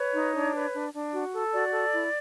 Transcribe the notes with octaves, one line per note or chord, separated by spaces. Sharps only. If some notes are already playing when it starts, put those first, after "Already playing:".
Already playing: B4 C#5
D#4
D4
B4
D4
D4
F#4
A4
F#4 D5
A4
E4